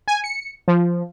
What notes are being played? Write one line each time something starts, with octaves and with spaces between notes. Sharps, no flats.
G#5
C#7
F3